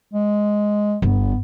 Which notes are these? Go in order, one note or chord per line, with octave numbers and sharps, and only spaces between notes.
G#3
G1 B3